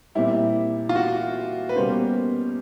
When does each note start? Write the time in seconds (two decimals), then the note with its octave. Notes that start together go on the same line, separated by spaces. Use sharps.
0.15 A#2 G3 C4 E4
0.89 F4
0.95 F#4
1.69 B4
1.76 B2 G3 A#3 C#4 C5